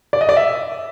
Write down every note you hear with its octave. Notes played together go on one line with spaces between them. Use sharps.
D5
D#5
D5
E5